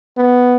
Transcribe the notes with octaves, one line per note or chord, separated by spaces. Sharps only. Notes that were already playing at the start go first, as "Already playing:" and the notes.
B3